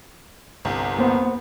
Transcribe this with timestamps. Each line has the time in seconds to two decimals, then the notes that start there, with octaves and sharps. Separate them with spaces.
0.65 G1 C2
0.99 A#3 B3 C5